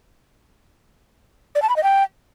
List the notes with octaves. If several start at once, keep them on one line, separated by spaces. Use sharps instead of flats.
D5
A5
B5
D#5
G5